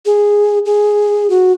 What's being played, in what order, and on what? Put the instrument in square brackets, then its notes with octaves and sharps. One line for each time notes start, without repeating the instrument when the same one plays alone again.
[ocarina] G#4
G#4
F#4